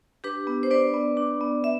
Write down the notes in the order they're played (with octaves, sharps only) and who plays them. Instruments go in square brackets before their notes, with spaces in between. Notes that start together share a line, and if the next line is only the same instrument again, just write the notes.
[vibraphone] D4 G4 B4
B3
C5
D4 B4 D5
B3
D4
B3
E5